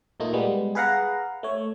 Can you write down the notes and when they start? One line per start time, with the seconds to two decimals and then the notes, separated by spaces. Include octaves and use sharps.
0.20 A#2 A3 A#3 D#4 F4
0.33 G3 G#3 B3
0.75 G#4 B4 F5 F#5 A#5
1.43 A3 C#5